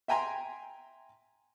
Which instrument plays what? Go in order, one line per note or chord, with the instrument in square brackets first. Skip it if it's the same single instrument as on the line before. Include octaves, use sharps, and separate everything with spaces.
[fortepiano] E5 G5 G#5 A#5 C6